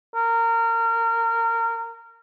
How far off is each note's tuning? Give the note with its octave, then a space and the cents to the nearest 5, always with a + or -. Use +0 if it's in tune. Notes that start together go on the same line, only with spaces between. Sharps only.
A#4 -25